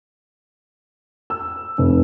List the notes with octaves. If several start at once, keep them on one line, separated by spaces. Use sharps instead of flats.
E6
F1